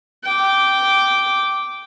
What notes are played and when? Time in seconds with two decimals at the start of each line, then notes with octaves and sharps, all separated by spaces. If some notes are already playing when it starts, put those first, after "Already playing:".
0.24 G5 D6